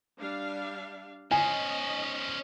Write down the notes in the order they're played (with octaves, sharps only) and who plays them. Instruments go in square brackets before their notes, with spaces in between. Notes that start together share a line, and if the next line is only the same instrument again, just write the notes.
[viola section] G3 D4 F5
[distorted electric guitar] C#4 C5 [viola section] D#5 [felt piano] G#5